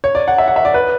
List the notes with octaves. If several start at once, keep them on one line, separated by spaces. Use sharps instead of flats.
C#5
D5
F#5
E5
F#5
E5
D5
B4